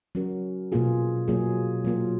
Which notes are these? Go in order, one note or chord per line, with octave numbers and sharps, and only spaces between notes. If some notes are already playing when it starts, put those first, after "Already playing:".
F#3 C#4 F#4 A#4
B2 A#3 F4 G#4
F#3 A#3 F4 G#4
F#3 A#3 F4 A#4